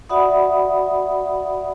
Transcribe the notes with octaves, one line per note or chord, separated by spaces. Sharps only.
F#4 D5 E5 F#5 B5 D#6